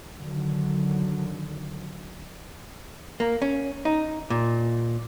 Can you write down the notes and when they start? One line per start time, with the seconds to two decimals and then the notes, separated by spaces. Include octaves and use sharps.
0.17 D3 D#3 F#3
3.20 A#3
3.42 C#4
3.85 D#4
4.30 A#2